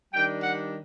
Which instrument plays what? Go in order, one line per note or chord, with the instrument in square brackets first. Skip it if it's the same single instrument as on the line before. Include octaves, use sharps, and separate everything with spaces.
[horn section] D#3 G3 D4 G5
F#5